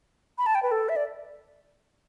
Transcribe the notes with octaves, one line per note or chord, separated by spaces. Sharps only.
B5
A5
G5
B4
A4
E5
D5